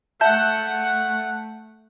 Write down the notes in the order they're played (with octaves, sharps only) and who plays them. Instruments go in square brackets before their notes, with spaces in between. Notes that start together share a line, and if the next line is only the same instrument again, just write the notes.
[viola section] A3 F#5 [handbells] E5 A5 G6